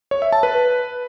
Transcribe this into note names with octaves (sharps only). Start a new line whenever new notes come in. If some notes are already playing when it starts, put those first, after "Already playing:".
C#5
E5
A5
B4